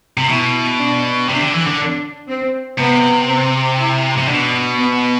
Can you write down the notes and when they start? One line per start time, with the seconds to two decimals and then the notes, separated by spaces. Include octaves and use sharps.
0.17 C3
0.29 B2 E4
0.79 D4
1.28 C3 D4
1.41 D3
1.54 E3
1.67 D3
1.79 D4
2.29 C4
2.78 C3 B3
3.28 C4
3.78 E4
4.18 C3
4.28 B2 D4
4.78 B3